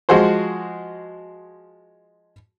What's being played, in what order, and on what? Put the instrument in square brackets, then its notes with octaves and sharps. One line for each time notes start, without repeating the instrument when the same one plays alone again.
[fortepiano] F3 G#3 F#4 G#4 C5